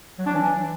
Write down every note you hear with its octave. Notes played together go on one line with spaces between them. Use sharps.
F#3
D4
E3